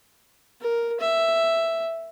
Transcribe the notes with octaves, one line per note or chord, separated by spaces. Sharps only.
A#4
E5